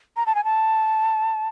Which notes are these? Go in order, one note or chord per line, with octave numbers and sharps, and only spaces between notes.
A#5
A5
G#5
A5